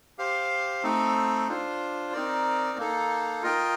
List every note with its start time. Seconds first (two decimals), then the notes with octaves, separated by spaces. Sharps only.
0.18 G4 C5 F5
0.83 A3 C4 D#4 A4
1.48 D4 F4 C5
2.13 C4 D#4 A#4 D5
2.78 A#3 D#4 A4
3.43 F4 A#4 D#5 G5